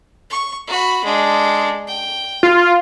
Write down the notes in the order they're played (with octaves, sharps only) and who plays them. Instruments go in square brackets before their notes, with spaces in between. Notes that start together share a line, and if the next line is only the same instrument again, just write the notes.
[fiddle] C#6
F#4 B5
G#3 D4
G5
[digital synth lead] F4